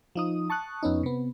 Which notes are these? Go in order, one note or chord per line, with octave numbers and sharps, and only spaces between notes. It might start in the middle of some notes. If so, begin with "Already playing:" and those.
F3 D#4 D#6
A5 C#6 D#6 F#6
F2 B3 C#4 D#4
C3 B3